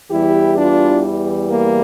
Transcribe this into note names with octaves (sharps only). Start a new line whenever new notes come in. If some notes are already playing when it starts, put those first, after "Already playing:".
E2 E3 G3 E4 G4
D4 F4
A#3